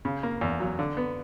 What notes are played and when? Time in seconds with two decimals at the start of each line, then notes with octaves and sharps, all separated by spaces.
0.05 C#3
0.23 A#3
0.41 E2
0.60 F#3
0.79 D3
0.97 B3